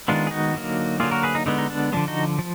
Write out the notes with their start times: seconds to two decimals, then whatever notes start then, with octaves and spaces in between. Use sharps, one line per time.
0.08 D#3 G#3 B3 D4 F4
0.27 G#4
0.31 D#4 F#4
0.54 D3 F#3 A#3
1.00 D3 F#3 A#3 F4 G#4
1.11 F#4 A#4
1.23 G#4 B4
1.35 D#4
1.46 D3 G#3 B3 D#4
1.58 D#4
1.70 D4
1.92 D3 F3 G#3 D4
2.08 D#4 F#4
2.39 F3